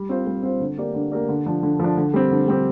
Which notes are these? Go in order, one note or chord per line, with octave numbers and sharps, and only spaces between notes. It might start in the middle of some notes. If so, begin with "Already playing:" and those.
Already playing: G3
C4 F4 C5
G3
C4 F4 C5
D3
A#3 G4 A#4 D5
D3
A#3 G4 A#4 D5
D3
F3 D4
D3
F3 D4
D3
G3 C4 G4
D3
G3 C4 G4